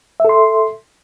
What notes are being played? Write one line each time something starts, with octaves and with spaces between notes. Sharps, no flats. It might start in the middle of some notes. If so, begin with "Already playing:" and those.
A4 E5 C6